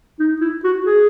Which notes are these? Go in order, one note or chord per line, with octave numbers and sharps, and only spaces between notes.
D#4
E4
F#4
G#4